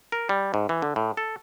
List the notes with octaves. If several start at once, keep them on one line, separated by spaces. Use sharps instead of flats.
A#4
G3
G#2
E3
D3
A2
A4